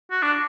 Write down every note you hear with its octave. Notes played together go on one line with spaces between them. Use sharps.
F#4
D4